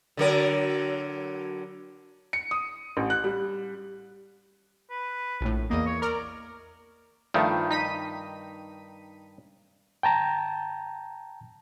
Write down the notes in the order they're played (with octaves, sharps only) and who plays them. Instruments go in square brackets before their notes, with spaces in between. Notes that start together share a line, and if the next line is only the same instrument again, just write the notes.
[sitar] D3 F#3 A#4
[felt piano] C#7
D#6
A1
F#6
G3
[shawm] B4
[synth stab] A#1 A2
[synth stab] E2 A#3 [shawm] D#5
[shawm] C#5
[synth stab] A#4 [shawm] D5
[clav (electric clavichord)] G2 D#3 [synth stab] F3 A3
[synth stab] D#4 B6 D#7
[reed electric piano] G5 A5 A#5